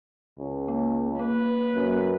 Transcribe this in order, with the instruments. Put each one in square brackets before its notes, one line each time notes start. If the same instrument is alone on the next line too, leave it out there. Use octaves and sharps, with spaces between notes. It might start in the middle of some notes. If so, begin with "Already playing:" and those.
[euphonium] C#2
[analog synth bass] A#3
[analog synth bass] A#3 [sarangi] B4
[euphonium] F#2